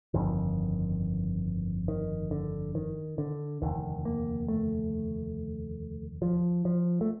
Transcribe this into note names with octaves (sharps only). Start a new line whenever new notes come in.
G1 F2 D3 D#3
D#3
D3
D#3
D3
F1 D#2 D3 D#3
A#3
A3
F3
F3
A3